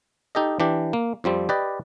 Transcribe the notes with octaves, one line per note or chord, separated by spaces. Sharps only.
D#4 G4 A4 D#5
E3 D4 G4
A#3
F2 F3 G3 C4
G4 B4 D5 D#5